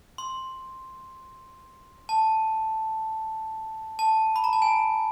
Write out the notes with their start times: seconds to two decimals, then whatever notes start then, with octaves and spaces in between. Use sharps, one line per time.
0.18 C6
2.09 A5
3.99 A5
4.36 B5
4.44 A#5
4.53 A5
4.62 G#5